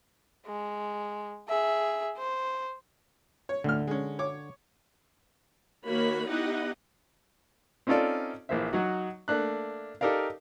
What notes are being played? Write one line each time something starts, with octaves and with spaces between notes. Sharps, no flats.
G#3
G#4 E5
C5
C#5
D2 A2 D3 F6
G#3 C#4
C#5 D6
D#3 A#3 F#4 C#5 B5
B3 D#4 E4 G4 D#5 F#5
C4 C#4 D#4 F4 A4 D5
A#1 E3 A#3 C5 E5
F#3 D#4 F#4
A3 A#3 D4 F#6
D#4 G4 A4 A#4 D5 F5